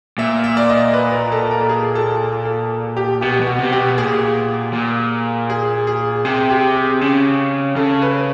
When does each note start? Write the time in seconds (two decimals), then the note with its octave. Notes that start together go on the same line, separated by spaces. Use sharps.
0.18 A#2 E5
0.44 E5
0.57 D5
0.69 D#5
0.94 B4
1.13 A#4
1.32 A4
1.51 A#4
1.61 A4
1.69 G#4
1.95 A4
2.45 A4
2.97 G4
3.21 B2 G4
3.41 B2
3.47 F#4
3.59 C3
3.72 G4
3.78 B2
3.97 A#2 G#4
4.73 A#2
5.50 G#4
5.87 G#4
6.25 C3 G#4
6.50 G4
6.75 G#4
7.01 C#3
7.76 C#3 A4
8.02 B4